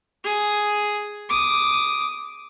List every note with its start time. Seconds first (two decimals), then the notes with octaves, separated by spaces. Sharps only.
0.24 G#4
1.29 D6 D#6